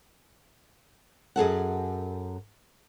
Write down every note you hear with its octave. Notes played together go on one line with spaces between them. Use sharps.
F#2 G#4 A4 F#5